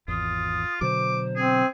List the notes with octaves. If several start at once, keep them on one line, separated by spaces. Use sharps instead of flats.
G#1 E2 F4 D#6
B2 D3 F#3 C5 D6
C4 G#4